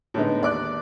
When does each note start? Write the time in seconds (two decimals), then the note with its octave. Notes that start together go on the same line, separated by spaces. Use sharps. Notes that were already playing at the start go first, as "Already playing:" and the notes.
0.14 A2 D3 G#3 B3 D#4
0.41 D#2 D5 D6 F#6